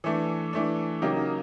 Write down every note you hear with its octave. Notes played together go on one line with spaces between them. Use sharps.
E3 A3 D4
E3 A3 D4
C#3 F#3 A#3 D#4 G4